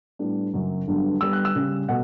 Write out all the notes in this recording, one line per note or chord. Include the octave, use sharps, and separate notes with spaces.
A2 G3 B3 D4
F#2 C#3 F#3
G2 D3 F#3 B3
D3 G3 B3 E6
F#6
E6
C#3 G3 C#4
B2 A3 F#5